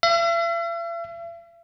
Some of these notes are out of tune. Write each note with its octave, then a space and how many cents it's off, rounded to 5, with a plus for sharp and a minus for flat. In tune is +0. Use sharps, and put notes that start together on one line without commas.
E5 +45